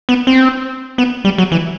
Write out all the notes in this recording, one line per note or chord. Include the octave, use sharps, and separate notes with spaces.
B3
C4
B3
G3
F#3
E3